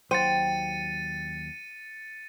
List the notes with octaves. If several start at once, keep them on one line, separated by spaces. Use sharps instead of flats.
D#2 F#3 C5 G5 A6 C#7 D#7